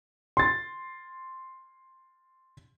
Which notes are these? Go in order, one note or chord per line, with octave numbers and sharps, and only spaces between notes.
C6 A6